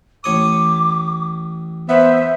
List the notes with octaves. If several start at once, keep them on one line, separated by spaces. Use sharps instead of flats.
A1 C#5 D6 D#6
B3 C5 E5